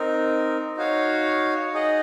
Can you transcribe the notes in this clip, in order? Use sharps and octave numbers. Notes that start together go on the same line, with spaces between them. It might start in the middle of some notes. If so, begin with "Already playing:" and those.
Already playing: C4 D#4 A#4
D#4 F#4 C#5 F5
D#4 G#4 D#5 F#5